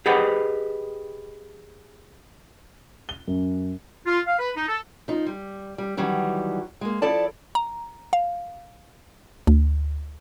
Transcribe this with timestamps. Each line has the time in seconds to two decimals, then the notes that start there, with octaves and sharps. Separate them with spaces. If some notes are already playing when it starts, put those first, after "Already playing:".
0.06 G4 G#4 B4 D#5 F#5
3.09 G7
3.28 F#2
4.06 F4
4.26 F5
4.39 B4
4.57 D#4
4.68 A4
5.08 F3 D#4
5.26 G3
5.78 G3
5.97 D#3 E3 F#3 G3 E4
6.81 G#3 A#3
7.02 F3 E4 A4 D5 A5
7.55 A#5
8.13 F5
9.47 D2